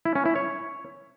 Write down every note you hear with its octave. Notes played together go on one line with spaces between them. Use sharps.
E4
C#4
E4
C#5